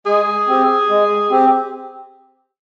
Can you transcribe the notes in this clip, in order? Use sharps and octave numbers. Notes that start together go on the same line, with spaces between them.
G#3 G#4
C4 G4
G#3
C4 G4